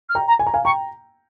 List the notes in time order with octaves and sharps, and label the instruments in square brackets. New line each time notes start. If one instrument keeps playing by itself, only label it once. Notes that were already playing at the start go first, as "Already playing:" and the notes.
[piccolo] F6
[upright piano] G5 A#5
[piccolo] A#5
[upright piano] G#5
A#5
F5 G#5
[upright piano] G5 A#5 [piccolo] C#6